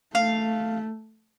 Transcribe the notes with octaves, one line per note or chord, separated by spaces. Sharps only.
A3 F5